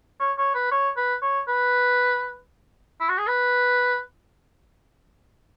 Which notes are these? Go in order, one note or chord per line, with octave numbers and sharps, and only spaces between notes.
C#5
C#5
B4
C#5
B4
C#5
B4
E4
F#4
G#4
B4